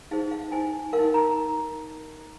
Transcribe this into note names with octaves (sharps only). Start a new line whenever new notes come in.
D#4 G#4 C5 F5
F5
D#4 C5 G#5
A#4 F5
D#4
A#5